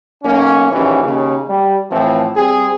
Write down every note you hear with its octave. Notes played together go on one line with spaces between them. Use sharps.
B1 A#3 C#4
A#1 D#2 E3 C#4
D#2 C#3
G3
A2 E3 F3 C4
G3 C4 G#4